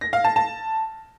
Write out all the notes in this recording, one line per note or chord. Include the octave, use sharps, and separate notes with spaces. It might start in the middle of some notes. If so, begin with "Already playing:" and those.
A#6
F5
A5
A5